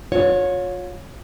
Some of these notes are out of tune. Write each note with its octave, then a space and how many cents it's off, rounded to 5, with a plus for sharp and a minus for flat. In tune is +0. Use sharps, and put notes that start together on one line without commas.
F4 +40 C#5 +0